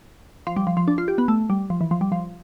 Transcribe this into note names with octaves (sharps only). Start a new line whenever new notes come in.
F3
G3
F3
F3
D4
F4
G4
B3
A3
G3
F3
E3
F3
G3
F3